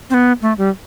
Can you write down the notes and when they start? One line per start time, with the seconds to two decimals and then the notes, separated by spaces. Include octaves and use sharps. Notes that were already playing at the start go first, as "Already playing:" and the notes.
0.10 C4
0.14 B3
0.42 A3
0.58 G3